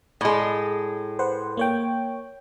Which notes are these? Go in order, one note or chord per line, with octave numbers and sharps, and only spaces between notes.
A2 G#3
B4 C5 F#5
A#3 C#5 G5